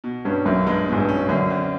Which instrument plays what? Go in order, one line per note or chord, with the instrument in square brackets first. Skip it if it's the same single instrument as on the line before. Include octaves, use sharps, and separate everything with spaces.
[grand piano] B2
[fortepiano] G2 [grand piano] C#4
[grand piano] B1 [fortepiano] F#2
[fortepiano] G2 [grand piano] G#3
[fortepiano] G#2 [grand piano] B2
[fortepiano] G2
[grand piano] C#4
[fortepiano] F#2 [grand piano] D3
[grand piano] C4